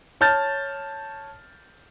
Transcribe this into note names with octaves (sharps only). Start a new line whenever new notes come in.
C#5 A5 F6 G6 A6